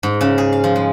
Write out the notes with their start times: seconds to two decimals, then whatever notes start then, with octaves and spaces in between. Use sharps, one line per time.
0.03 G#2
0.21 C#3
0.38 G#4
0.52 F5
0.64 F3
0.76 G#3